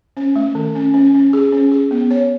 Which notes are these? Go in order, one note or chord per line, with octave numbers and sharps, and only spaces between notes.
C#4
A3
D#3
C#4
C#4
C#4
G#4
C#4
G#4
B3
C#5